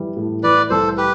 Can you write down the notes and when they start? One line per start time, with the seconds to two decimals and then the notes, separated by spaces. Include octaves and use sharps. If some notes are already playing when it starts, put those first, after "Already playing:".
Already playing: E3 G3
0.17 A2
0.43 E3 B4 D5
0.69 C2 A4 C5
0.97 G4 B4